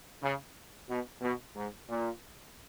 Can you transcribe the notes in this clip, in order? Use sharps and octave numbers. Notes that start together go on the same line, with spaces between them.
C#3
B2
B2
G#2
A#2